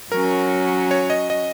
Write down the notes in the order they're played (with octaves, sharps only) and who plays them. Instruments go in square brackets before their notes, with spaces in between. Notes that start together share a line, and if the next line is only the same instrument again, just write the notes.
[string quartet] F#3 C#4 F#4 [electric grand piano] A#4
[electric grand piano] C#5
D#5
D#5